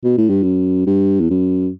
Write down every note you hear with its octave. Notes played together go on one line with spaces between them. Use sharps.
B2
A2
G2
F#2
G2
E2
F#2